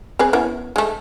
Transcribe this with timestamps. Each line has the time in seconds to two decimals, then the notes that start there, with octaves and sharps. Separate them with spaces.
0.19 C4 G#4 B4
0.33 B3 C#4 E4
0.76 G#3 A3